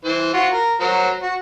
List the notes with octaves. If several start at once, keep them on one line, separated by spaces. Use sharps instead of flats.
E3 C5
F4 F#4
A#4
F#3 A#4 C5
F#4